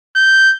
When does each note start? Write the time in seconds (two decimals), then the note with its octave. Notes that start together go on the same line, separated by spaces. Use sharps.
0.16 G6